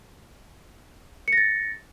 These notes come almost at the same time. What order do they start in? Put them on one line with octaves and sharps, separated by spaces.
C#7 A#6 A6